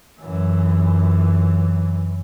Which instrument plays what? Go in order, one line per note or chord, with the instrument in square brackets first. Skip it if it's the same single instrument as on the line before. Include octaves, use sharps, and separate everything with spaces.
[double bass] F#2 E3